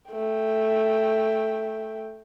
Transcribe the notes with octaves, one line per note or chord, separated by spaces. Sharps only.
A3 G5